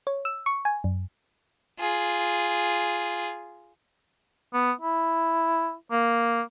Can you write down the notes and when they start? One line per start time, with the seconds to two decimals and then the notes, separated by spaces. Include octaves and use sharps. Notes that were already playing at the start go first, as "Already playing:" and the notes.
0.07 C#5
0.25 E6
0.46 C#6
0.65 G#5
0.84 F#2
1.79 F4 G#4
4.54 B3
4.81 E4
5.91 A#3